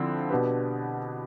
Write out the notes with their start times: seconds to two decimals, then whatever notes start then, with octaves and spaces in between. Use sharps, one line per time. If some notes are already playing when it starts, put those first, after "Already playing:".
Already playing: D3 F3 C4 E4
0.30 B2 B3 D4 G4 B4